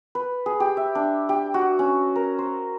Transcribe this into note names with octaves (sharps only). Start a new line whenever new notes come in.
B4
G#4
G4
E5
D4
G4
F#4
C#4
A#4
C5